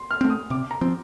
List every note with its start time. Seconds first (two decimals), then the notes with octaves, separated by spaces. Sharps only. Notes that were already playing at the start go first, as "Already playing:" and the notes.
Already playing: C6
0.11 F6
0.21 A3 C4
0.30 D#6
0.50 C3 D6
0.71 A#5
0.81 F3 C4